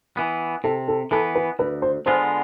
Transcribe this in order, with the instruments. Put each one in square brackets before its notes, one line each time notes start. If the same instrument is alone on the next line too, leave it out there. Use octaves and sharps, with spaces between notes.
[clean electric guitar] E3 B3
[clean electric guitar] C3 [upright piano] A4
[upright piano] A4
[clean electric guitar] E3 B3 [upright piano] A4
[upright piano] B4
[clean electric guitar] D2 [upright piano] B4
[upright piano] C5
[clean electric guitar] D3 G#3 B3 F4 [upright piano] C5